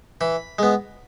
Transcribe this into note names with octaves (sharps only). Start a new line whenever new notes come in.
E3 B5
G#3 B3